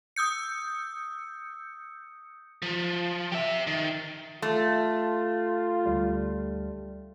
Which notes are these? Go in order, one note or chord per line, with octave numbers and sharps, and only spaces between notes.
D#6 E6 G6 C#7
F3
G4 E5
D#3
A3 F4 C6
D2 G3